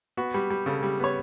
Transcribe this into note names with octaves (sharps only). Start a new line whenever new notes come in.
B3 F#4
G3
G3
C#3 A4
G3
B3 C#5